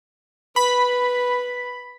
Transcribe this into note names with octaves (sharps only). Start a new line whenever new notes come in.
B4 B5